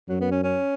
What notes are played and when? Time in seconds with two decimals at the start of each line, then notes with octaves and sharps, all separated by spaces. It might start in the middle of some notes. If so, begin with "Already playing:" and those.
0.09 F#2 F#3
0.21 B3
0.32 C#4
0.44 C#4